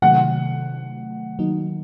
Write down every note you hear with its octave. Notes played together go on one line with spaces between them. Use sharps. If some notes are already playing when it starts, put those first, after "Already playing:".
C3 D#3 F#3 A3 F#5
D#3 F#3 A#3 D#4